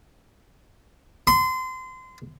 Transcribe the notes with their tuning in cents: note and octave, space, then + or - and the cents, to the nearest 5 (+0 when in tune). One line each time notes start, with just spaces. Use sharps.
C6 -30